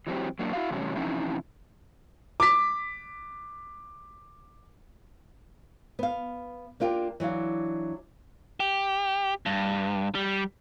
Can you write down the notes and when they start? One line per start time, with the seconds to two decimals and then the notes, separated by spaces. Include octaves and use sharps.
0.07 E3 F#3 C4 G4
0.39 F#3 A#3 D4 F#4
0.53 E4 F#4 F5
0.70 A2 C3 E3 F#3 G3 C#4
0.96 C3 E3 F3 C#4 D#4 E4
2.40 D6 B6
5.99 B3 F5
6.80 A#3 D4 F4 G4 A#4
7.20 E3 F#3 D4 F5
8.60 G4
9.46 G2
10.15 G3